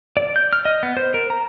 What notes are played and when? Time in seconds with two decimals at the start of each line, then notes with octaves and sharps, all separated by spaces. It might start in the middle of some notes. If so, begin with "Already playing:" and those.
0.17 D5
0.36 G6
0.53 F6
0.65 D#5
0.83 B3
0.97 C5
1.14 A#4
1.30 A#5